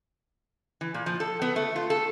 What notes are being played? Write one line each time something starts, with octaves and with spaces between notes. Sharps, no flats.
E3
A#2
F3
A4
B3
A3
F4
A4